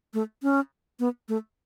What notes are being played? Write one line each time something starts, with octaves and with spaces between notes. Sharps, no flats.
A3
C#4
B3
A3